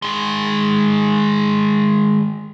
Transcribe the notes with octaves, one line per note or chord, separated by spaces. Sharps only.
D#3 G#3